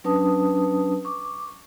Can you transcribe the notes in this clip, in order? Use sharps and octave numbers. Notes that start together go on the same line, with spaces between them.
F#3 C#4 D4 B4 A5 D#6
C#6 D6